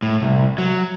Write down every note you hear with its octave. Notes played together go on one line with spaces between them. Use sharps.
A2
C2
F#3